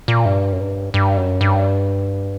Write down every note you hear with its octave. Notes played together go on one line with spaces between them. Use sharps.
A#2
G2
F#2
G2
G2
F#2
G2